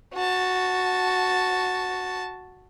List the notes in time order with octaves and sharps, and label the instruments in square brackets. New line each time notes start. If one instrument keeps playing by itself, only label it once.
[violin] F#4 A5